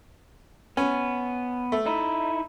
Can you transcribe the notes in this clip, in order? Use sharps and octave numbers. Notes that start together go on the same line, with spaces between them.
B3 C#4
A3
D#4 E4